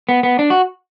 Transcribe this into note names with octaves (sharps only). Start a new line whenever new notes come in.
B3
B3
D4
F#4